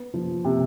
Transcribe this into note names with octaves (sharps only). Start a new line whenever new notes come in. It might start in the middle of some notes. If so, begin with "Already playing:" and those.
Already playing: B3
F3
C3